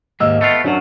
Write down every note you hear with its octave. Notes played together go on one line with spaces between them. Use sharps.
D#2 G#2 A#3 D#5 E6
A3 B3 F4
F#2 F#3 C#4 D4